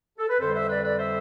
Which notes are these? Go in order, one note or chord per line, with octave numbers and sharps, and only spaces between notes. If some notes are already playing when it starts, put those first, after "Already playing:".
A4
B4
F2 D3 G3 A4 C5
C5 E5
B4 D5
B4 D5
C5 E5